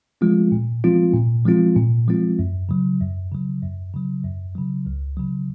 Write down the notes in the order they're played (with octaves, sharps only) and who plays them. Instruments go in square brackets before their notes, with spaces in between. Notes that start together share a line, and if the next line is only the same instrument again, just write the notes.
[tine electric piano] F3 G#3 C4 F4
A#2
F3 G#3 C4 F4
A#2
F3 G#3 C4 F4
A#2
F3 G#3 C4 F4
F#2
C#3 F#3
F#2
C#3 F#3
F#2
C#3 F#3
F#2
C#3 F#3
C#2
C#3 F#3